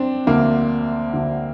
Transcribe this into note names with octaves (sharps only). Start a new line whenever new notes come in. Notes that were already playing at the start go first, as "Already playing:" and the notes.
Already playing: C4 D4
D2 D3 A#3
D2 D3